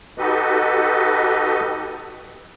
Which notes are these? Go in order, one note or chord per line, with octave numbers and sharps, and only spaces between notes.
D#4 F#4 G4 A4 B4 D#5